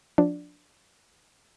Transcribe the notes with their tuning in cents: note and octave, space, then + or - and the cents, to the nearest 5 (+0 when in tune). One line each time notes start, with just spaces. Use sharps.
F3 +25 D4 +0